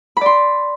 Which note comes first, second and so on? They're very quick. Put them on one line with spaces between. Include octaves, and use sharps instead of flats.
B5 D5 C6